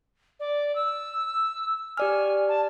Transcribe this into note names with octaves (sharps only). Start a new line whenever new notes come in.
D5
E6
G4 D5 G#5 F6
A5